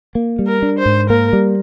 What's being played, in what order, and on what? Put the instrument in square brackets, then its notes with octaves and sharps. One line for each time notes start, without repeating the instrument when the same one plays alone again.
[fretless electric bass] A#3
G3
[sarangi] A#4
[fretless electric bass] D4
[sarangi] C5
[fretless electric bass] G#2
[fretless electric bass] A#3 [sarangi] A#4
[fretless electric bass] G3